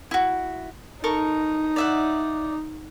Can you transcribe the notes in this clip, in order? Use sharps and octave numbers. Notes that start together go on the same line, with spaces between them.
E4 F#4
D#4 A4 A#4 C#6
D5 E5 F#5